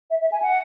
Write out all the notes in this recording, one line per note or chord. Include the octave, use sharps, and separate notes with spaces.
E5
E5
G#5
F#5